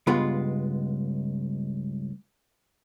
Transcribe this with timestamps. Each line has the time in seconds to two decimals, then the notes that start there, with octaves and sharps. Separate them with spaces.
0.07 C#2 G2 G#3 B3 F4